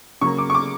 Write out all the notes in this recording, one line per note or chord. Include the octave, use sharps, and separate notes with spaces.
C#3 F#3 A#3 C#6
D6
C#6
D6